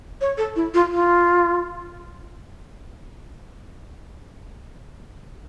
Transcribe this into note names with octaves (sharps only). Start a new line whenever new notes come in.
C#5
A4
E4
F4
F4